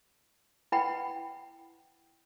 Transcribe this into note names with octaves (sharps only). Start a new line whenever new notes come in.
E4 B4 F#5 G5 B5